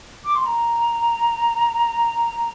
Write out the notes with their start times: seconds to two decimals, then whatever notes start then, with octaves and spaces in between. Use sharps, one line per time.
0.25 D6
0.35 C6
0.46 A#5